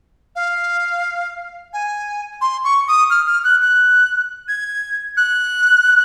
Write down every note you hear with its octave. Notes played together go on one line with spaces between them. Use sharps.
F5
G#5
C6
C#6
D#6
F6
F6
F#6
F#6
G#6
F#6